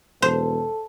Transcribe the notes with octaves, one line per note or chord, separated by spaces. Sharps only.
E1 A4 C5